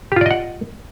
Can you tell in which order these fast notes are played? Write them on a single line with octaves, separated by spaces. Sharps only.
G4 F4 D5 D#5 F#5